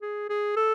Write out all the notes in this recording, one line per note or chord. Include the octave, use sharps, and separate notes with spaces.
G#4
G#4
A4